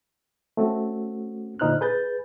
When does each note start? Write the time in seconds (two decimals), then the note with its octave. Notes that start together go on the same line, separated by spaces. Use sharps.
0.57 A3 C4 C#4 F#4
1.59 A#2 D3 D#4 C5 F6 F#6
1.81 G#4 B4 G6 A6